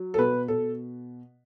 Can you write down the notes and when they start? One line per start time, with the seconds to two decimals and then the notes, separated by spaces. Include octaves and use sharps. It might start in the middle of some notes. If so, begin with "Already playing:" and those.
Already playing: F#3
0.14 A4
0.18 B2 B4
0.48 B2 A4